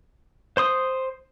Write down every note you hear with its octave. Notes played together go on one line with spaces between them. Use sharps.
C5 C6 D#6